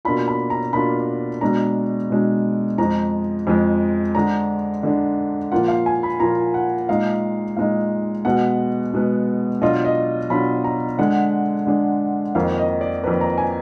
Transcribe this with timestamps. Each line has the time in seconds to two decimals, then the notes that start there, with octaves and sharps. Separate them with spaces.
0.05 B2 A#3 D4 F4 B5
0.28 B5
0.50 A#5
0.73 B2 A#3 D4 F4 B5
1.41 B2 G#3 D4 A#5
2.10 B2 G#3 D4
2.78 F2 F3 G#3 A#5
3.47 F2 F3 G#3
4.15 D3 G#3 D4 A#5
4.83 D3 G#3 D4
5.52 A#2 F3 A#3 F4 F#5
5.68 F5
5.86 G#5
6.03 B5
6.20 A#2 F3 A#3 F4 A#5
6.54 F#5
6.89 A#2 G#3 D#4 F5
7.57 A#2 G#3 D#4 F5
8.25 B2 G#3 B3 F#5
8.93 B2 G#3 B3
9.61 B2 F#3 D4 F4 D#5
9.85 D#5
10.30 B2 F#3 D4 F4 B5
10.64 A#5
10.99 D3 G#3 D4 F#5
11.67 D3 G#3 D4
12.35 F2 D#3 A#3 F5
12.58 D#5
12.81 D5
13.04 F2 D#3 A#3 B4
13.21 A#5
13.38 G#5